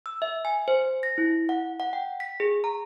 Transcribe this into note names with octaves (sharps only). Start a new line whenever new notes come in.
E6
E5
G#5
C5
A#6
E4
F#5
F#5
G5
B6
G#4
A#5